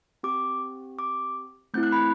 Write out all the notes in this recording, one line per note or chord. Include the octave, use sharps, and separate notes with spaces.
C4 G4 D6
D6
A3 C4 E4 G6
F#6
B5